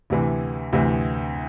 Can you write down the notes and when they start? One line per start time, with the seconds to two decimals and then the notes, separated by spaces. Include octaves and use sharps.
0.10 D2 C3 E3
0.73 D2 C3 E3